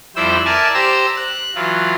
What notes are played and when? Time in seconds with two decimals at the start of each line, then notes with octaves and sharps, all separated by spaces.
0.16 F2 G3 E4 C5 G5 E6
0.45 A#4 D5 E5 G#5 A5
0.74 G4 C5 A#5 E6
1.17 F#6
1.55 E3 F#3 F4